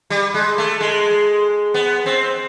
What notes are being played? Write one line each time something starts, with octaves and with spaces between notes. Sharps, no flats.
G3
G#3
A3
G#3
B3
C4